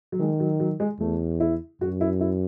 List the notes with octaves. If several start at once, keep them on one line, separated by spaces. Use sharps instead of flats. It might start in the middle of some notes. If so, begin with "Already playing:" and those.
F#3
D#3 G#3
F#3
F#3
G#3
E2 A3
E4
F#2 F#4
E4
E4